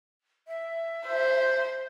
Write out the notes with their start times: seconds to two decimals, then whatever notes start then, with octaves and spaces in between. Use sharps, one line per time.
0.48 E5
1.07 C5